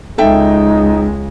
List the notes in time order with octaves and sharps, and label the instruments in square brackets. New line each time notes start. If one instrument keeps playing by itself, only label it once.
[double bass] C#2 G#3 [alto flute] D#4 [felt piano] A4 E5 G5